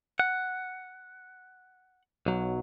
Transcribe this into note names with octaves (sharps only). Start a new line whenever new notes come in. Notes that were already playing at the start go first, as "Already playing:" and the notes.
F#5
B1 F#3